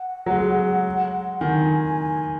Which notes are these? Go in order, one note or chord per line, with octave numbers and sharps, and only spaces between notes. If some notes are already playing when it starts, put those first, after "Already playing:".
Already playing: F#5
F#3
G#3
D#3 G#5